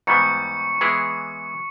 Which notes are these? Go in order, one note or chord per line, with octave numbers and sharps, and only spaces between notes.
G#2 E3 G3 B3 C#6 C#7
E3 G#3 B3 E4 G#4